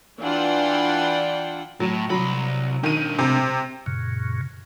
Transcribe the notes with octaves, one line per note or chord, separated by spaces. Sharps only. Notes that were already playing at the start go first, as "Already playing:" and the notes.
E3 D4 F4 F#5 G5
A2 F#3
C2 F#3 B5
B2 D#3 D4 D#7
C3
F#2 A#2 C#3